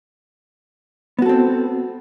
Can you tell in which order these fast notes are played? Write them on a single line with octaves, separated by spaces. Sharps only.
B3 F#4 A4 C4